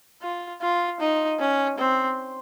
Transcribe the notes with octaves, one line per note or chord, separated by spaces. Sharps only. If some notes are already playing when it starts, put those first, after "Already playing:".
F4
F4
D#4
C#4
C4